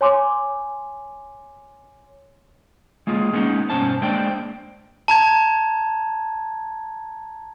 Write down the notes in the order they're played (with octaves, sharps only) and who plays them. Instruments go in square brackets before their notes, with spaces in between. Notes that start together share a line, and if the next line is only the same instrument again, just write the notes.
[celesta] C#5 G#5 C6 D6
[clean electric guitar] G#3 A#3 F4 G#4
G#3 A#3 B3 C#4 D#4
G2 B2 C#4 C5 A5
G#3 A#3 D4 C5 D5 G5
[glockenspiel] A5 A#5 G#6